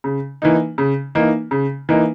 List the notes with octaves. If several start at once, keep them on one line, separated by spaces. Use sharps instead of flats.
C#3
E3 A#3 D#4
C#3
E3 A#3 D#4
C#3
E3 A#3 D#4